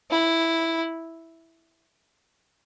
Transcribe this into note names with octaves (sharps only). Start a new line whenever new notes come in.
E4